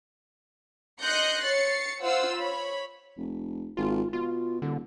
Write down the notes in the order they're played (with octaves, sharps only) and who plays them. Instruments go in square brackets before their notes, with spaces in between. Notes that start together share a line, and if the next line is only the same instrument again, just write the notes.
[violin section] D#5 C6 F#6 G6 A#6 C#7
C#5 A6 C7 C#7
F4 C5 F5 F#5 E6
C#5 B5
[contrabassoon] F1
[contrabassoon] G#1 [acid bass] F4
[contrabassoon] B2 [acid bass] F4
[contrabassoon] D#1 [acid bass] D3